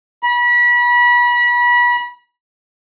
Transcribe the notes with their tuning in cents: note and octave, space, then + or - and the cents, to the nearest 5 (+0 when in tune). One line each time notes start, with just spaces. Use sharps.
B5 -30